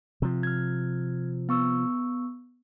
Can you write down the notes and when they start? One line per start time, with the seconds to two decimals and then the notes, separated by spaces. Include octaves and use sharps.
0.22 C3 F3
0.43 F6 G#6
1.49 B3 C#6 E6